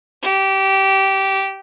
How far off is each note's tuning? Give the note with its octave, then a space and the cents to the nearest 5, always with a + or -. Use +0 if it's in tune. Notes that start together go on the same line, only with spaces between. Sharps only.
G4 -20